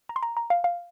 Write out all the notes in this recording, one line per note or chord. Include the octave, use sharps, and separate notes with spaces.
A#5
C6
A#5
A#5
F5
F5